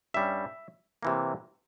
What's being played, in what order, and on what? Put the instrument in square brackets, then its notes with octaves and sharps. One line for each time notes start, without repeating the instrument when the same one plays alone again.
[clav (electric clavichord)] G2 G3 C#4 E5
C3 E3 A#3